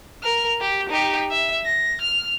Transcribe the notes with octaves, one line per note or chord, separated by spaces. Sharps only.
A#4 F6
G4
D#4 G4
E5
A#6
F6